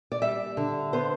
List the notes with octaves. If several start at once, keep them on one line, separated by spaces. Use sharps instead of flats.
D5
G3 E5
D3
B3 C5